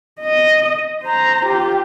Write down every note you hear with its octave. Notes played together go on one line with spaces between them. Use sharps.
D#5
C5 A#5
F4 G4